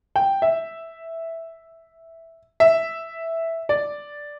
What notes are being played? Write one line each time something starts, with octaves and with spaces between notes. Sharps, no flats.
G5
E5
E5
D5